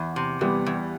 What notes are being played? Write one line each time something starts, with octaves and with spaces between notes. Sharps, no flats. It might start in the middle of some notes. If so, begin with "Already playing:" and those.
Already playing: E2
C3
E2 G3 B3
E2